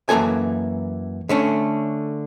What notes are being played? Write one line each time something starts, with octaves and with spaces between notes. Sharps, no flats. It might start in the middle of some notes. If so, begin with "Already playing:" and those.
F#2 E3 A#3 A4 G#5
D3 A3 C#4